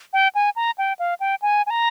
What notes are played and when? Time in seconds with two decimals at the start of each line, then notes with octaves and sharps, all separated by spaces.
0.13 G5
0.35 G#5
0.56 A#5
0.78 G5
0.99 F5
1.20 G5
1.42 G#5
1.66 G#5
1.70 A#5